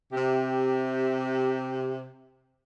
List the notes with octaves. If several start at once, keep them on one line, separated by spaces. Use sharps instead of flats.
C3 G4